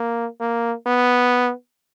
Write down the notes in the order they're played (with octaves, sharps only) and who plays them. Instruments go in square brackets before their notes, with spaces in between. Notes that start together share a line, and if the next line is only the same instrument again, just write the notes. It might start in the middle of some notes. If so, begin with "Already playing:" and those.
Already playing: [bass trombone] A#3
A#3
B3